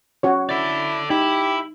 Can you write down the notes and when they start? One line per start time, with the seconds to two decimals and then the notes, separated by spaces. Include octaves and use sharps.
0.23 C#4 F#4 C#5
0.49 E4 A4 D5
1.10 D#4 E4 G4